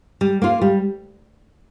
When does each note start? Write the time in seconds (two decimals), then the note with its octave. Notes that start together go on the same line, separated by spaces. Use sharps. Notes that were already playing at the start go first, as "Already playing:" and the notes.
0.21 G3
0.42 A#3 F4
0.62 G3